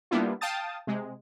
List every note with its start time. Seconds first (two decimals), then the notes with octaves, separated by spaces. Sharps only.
0.11 G3 A#3 B3 D4 E4 F4
0.41 F5 G5 A5 D#6 A6
0.87 C3 G#3